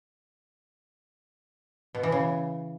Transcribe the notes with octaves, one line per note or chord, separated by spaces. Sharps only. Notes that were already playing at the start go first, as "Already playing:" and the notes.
B2
E3
C#3